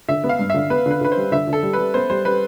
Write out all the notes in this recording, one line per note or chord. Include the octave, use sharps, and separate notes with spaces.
D3 E5
B3
F5
G2
D3 E5
B3 B4
D3 B4
D3 B4
C5
G3
D3 E5
D3
A4
G3
G3 B4
B3 C5
G3 C5
G3 B4